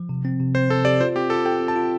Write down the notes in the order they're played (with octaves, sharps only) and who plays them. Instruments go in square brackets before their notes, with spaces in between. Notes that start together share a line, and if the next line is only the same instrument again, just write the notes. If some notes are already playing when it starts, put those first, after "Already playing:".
Already playing: [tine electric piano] F3
C3
C4
C3
[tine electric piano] C4 [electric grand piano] C5
[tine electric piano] C4 [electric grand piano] A4
[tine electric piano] G4 [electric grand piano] D5
[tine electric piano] F4 [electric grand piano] C5
[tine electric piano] C4 [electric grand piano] G4
[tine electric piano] F4 [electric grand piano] A4
[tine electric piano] A4 [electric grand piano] G5
[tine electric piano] C4
[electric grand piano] A5
[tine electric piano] F4